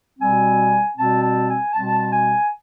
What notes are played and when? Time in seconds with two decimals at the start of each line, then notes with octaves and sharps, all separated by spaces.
0.20 B2 G3 C4 G#5
0.97 B2 G3 C4 A5
1.22 A5
1.48 G#5
1.73 B2 G3 C4 A5
2.12 G#5